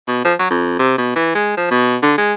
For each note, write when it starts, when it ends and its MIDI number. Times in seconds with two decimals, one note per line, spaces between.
0.08 0.20 47
0.24 0.34 53
0.39 0.49 54
0.50 0.78 41
0.79 0.94 48
0.98 1.13 47
1.16 1.35 52
1.35 1.53 56
1.57 1.66 53
1.71 1.96 47
2.02 2.13 50
2.18 2.33 56